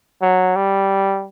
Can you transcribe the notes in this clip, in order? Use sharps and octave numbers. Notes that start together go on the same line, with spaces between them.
F#3
G3